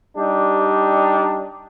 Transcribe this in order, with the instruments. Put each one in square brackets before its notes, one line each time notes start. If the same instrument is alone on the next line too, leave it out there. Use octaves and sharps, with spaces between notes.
[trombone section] G3 D4 D#4 G4